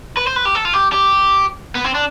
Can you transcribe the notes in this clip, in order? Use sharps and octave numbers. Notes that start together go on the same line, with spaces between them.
B4
C5
B4
G4
A4
F4
G4
G4
B3
C4
D4